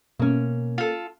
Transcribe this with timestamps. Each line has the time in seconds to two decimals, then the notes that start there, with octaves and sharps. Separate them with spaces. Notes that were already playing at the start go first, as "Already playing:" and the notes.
0.20 B2 A#3 C#4
0.78 F4 A4